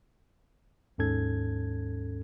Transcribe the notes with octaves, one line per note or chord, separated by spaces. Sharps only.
D#2 G#2 C#4 A4 G#6